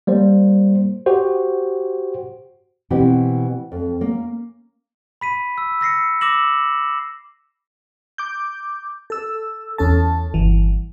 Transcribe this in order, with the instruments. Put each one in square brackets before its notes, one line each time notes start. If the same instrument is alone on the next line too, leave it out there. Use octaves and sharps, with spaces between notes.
[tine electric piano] G3 A#3 C5
F#4 G4 C5
[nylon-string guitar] B2 E3 C4 G4
F2
A#3 C#4
[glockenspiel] B5 B6 D#7
E6
E6 A#6 C7 C#7
D6 E6 A#6 E7 F#7
[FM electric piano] D6 G6
A4 E6
E2 C#4 A4 A5
G1 E3